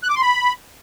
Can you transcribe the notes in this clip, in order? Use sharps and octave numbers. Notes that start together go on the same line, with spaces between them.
F#6
D6
C6
B5